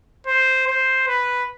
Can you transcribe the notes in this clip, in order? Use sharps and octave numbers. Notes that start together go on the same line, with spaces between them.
C5
C5
B4